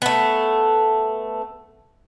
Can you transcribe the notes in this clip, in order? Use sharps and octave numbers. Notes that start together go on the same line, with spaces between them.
A3 B3